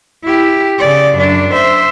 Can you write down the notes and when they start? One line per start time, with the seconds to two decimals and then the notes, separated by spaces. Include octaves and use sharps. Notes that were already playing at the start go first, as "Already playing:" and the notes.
0.23 E4 G4
0.79 C#3 D5
1.15 F#2 D4
1.52 C5 E5